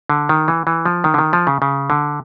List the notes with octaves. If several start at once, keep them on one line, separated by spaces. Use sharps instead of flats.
D3
D#3
E3
E3
F3
D#3
D3
D#3
F3
C#3
C#3
D3